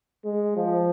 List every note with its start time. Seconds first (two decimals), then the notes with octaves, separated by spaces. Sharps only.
0.24 G#3
0.56 F3